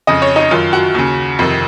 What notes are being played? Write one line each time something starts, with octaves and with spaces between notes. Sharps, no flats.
F2 C#3 D#5
C#5
D#4
F#2 D#3 F4
F#4
D#2 C#3
F2 C3 D#3